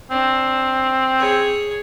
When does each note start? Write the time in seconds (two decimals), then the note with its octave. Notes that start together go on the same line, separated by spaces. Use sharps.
0.11 C4 D4
1.18 G#4 C#5